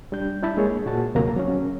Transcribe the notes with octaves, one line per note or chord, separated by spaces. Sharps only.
G3 D4 G6
D4 E4 A5 B5
G#3 A#3 G#4 C#5
A#2 F#4 G#4 A5
D2 C3 F#3 A#3 A#5
F#3 C#4